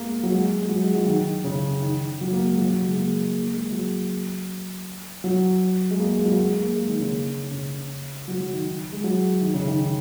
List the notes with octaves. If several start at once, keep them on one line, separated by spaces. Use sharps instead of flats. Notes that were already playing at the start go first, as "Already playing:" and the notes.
Already playing: G#3 A#3
F#3
G#3
G#3
F#3
G#3
F#3
D#3
C#3
D#3
F#3
A#3
G#3
F#3
C#3
G#3
A#3
A#3
G#3
F#3
F#3
G#3
A#3
G#3
F#3
A#3
G#3
A#3
G#3
D#3
C#3
C#3
F#3
F#3
D#3
G#3
F#3
D#3
C#3
D#3